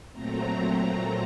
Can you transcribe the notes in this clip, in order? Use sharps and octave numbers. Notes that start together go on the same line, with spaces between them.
A#2 F#3 A3 C4 A#5
A#5